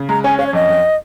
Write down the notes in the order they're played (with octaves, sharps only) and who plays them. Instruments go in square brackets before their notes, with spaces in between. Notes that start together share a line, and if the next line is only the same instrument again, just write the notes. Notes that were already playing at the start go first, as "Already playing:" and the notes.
Already playing: [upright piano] C#3
[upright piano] G#3 [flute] A#5
[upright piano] C#4 [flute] G#5
[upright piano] C#4 [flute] F5
[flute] C#5
[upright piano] F2 [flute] D#5
[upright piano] F2